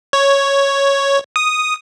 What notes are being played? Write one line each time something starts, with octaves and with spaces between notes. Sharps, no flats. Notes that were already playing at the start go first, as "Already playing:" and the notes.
C#5
D#6